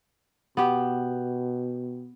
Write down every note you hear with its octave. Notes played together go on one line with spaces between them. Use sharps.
B2 B3 G4